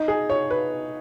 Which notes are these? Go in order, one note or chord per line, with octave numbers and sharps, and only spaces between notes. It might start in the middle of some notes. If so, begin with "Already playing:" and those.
Already playing: D#4
G#4
C#5
B4